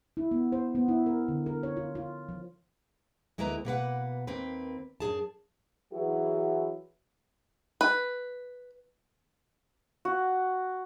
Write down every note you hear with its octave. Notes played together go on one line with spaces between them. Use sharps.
E4
B3
C5
B3
E4
A#4
D3
A#4
C#5
F4
F4
F3
D2 G#3 A#3 E4 B4 A#5
B2 A#3 B4 F#5
D#2 A#3 C4 B4
F#2 B2 G#4 A5
E3 F#3 E4 F#4 G#4 B4
B4
F#4